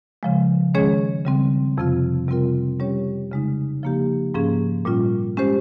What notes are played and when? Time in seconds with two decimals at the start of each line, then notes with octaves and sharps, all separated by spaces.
0.23 C#3 F3 G#3
0.74 D#3 G#3 C#4 G#4 C#5
1.25 C#3 G3 C4
1.78 F2 C3 F3 C4 F4
2.28 C3 G3 C4 F4 A#4
2.80 G3 C#4 G4 C#5
3.32 C#3 G#3 D#4
3.83 C#3 F3 A#3 D#4 G4
4.34 G#2 F3 A#3 C#4 G#4
4.85 A#2 G3 C#4 F4
5.37 G#3 C#4 G4 C5